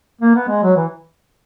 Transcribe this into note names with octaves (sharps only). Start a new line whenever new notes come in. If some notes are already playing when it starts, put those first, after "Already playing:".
A#3
B3
G#3
F#3
E3